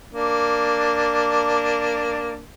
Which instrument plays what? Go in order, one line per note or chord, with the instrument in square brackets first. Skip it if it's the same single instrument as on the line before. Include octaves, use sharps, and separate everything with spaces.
[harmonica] A#3 D4